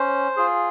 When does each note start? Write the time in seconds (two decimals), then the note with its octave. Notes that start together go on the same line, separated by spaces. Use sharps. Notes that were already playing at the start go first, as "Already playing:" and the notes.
Already playing: C#4 C5
0.37 F4 G#4